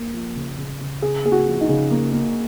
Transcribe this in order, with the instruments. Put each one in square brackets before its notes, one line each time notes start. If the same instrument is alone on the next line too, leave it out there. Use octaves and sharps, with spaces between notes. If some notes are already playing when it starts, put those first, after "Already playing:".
Already playing: [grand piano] A#3
F3
C#3
C#3
C#3
[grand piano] C#3 [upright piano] G#4
[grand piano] A#3 [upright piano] G#4
[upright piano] F#4
[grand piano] F3
[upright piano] D#4
[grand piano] C#3
A#3
A#3